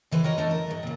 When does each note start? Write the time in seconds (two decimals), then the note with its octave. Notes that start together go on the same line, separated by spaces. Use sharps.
0.11 C#3 E3 B4 C5
0.24 F#4 A#4 C#5 D#5
0.38 D3 A3 B3 D4 D#5
0.51 A#4
0.71 G#2
0.83 A#2 C#3